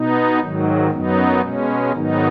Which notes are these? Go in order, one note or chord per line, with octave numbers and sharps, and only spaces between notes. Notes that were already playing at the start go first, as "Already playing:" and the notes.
Already playing: B2 B3 D#4
G#2 D#3 F#3
F#2 F#3 B3 D#4
B2 G#3 C#4
G#2 D#3 F#3 B3 D#4